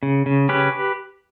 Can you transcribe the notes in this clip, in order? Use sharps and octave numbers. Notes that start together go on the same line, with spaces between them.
C#3
C#3
C#4 G4 B4